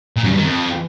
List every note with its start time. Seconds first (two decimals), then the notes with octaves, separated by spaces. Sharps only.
0.17 A#2
0.23 F#2
0.30 G2
0.37 D#3
0.44 F2